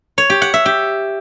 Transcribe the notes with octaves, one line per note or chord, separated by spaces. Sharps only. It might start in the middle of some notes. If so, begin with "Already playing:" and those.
C#5
G4
F#5
E5
G4